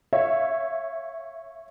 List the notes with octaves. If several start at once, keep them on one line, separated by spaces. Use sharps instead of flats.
C#5 E5 F5